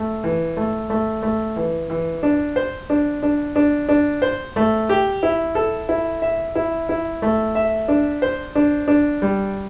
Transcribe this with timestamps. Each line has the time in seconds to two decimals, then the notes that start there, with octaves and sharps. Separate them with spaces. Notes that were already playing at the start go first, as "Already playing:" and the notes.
Already playing: A3
0.24 E3
0.57 A3
0.90 A3
1.23 A3
1.56 E3
1.90 E3
2.23 D4
2.56 C5
2.90 D4
3.23 D4
3.56 D4
3.89 D4
4.22 C5
4.56 A3
4.89 G4
5.23 E4
5.55 A4
5.89 E4
6.22 E5
6.55 E4
6.89 E4
7.22 A3
7.55 E5
7.88 D4
8.22 C5
8.55 D4
8.88 D4
9.22 G3